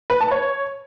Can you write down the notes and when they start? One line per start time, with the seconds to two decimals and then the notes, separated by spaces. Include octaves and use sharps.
0.10 B4
0.21 A5
0.31 C#5